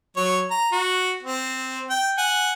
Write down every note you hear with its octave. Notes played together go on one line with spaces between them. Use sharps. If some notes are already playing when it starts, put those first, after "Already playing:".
F#3 C#5
A#5
F#4
C4
G5
F#5 G#5